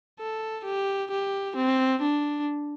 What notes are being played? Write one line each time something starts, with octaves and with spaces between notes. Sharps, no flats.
A4
G4
G4
C4
D4